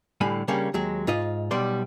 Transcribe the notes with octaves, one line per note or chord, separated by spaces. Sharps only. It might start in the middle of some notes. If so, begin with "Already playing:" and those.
A2 D3 G3 G#5 B5
C#3 G3 A#3 C#4 D4
D#2 F#3 G#3
G#2 F4 D#5
B1 B2 G3 D5 C6